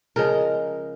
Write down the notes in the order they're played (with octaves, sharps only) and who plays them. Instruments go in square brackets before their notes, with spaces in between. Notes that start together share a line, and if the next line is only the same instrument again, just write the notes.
[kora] C#3 F3 G#3 A#4